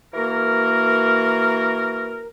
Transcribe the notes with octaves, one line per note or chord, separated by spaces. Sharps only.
E3 A#3 F#4 A#4